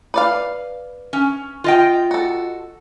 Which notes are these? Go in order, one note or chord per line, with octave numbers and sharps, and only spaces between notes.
B4 D5 F5
C#4
F4 D#5 G5
F#4 A4